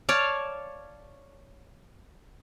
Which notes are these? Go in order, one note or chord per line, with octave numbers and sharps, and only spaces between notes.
C#5 D5 F5 A5